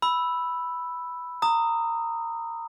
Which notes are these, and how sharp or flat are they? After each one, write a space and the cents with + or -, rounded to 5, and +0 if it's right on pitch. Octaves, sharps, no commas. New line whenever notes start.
B5 +0 E6 +0
A#5 -20 D#6 +0